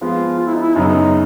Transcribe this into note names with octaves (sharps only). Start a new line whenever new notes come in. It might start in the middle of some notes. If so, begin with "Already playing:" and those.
F3 G#3 B3 F4
F4
E4
D#4
E4
F#2 C#3 F#3 B3 D#4